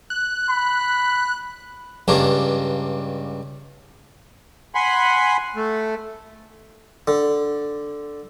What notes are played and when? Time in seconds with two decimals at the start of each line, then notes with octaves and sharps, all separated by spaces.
0.10 F#6
0.50 B5
2.08 C#2 G2 A#3 D4
4.75 F#5 G#5 B5 C6
5.56 A3
7.08 D3